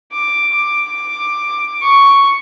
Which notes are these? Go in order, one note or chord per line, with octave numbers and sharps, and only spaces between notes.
D6
D6
C#6